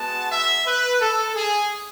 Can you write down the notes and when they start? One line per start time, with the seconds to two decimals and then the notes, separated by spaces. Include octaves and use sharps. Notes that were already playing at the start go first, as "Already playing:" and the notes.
Already playing: G#3 B3 F#4 A5
0.31 E5
0.66 B4
1.01 A4
1.36 G#4